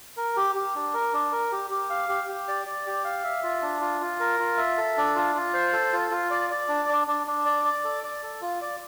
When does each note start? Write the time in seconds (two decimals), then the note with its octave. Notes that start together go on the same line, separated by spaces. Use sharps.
0.17 A#4
0.37 G4
0.55 G4
0.75 D4
0.94 A#4
1.13 D4
1.32 A#4
1.52 G4
1.70 G4
1.90 F5
2.09 G4
2.28 G4
2.48 D5
2.66 D5
2.86 G4
3.04 F5
3.24 E5
3.43 F4
3.62 D4
3.81 F4
4.01 F4
4.20 A#4
4.40 F4
4.58 E5
4.77 A4
4.97 D4
5.15 F4
5.35 F4
5.54 C5
5.73 A4
5.93 F4
6.11 F4
6.31 D5
6.50 D5
6.69 D4
6.89 D4
7.07 D4
7.27 D4
7.45 D5
7.65 D5
7.84 A4
8.04 D5
8.23 A4
8.42 F4
8.61 D5